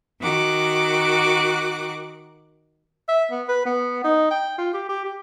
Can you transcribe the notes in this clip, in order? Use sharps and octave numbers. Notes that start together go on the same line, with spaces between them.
D#3 F#4 D6 F#6
E5
B3
B4
B3
D#4
G5
F4
G4
G4
G4